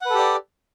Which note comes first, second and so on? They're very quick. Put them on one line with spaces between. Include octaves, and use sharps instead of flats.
F#5 B4 A4 G4 D5